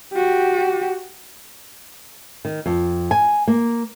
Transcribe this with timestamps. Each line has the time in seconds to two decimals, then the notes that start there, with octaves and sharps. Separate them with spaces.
0.13 F#4 G4
2.45 D#3
2.66 F2
3.11 G#5
3.48 A#3